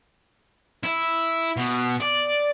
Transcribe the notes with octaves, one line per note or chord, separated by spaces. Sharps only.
E4
B2
D5